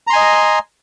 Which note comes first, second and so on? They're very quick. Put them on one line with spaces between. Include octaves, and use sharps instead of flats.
A#5 C6 G#5 D#5